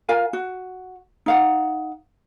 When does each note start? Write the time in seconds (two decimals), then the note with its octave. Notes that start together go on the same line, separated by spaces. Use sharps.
0.09 F4 A#4 F5 G#5
0.33 F#4
1.26 D#4 F5 F#5